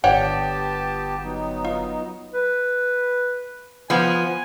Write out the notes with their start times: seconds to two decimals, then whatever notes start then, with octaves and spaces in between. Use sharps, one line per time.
0.04 G1 B3 G4 C#5 D5 F#5 G5 A5
1.24 F#3 B3 D#4
1.65 F4
2.34 B4
3.90 F3 B3 G#5